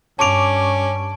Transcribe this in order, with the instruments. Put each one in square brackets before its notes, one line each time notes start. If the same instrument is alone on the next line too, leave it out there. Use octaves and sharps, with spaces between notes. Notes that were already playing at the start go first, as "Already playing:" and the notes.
[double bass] G2 [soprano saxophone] C#4 [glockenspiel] A5 D7 [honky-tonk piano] C#6 D6 F7